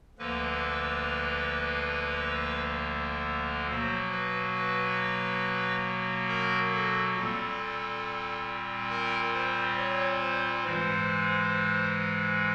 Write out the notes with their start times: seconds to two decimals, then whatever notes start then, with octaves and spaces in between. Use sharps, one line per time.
0.19 D2 D3 F3 A#3 B4
3.67 B2 F#3 A#3 C5
4.11 B4
4.54 B4
6.28 A#4
6.72 A4
7.16 A#2 G3 C4 A4
8.90 A#4
9.34 C5
9.77 C#5
10.20 C5
10.64 G#2 E3 G#3 C5